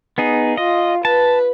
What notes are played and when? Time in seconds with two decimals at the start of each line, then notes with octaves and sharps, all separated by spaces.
0.18 B3 D#4 G#4
0.57 F4 D#5
1.05 B4 A5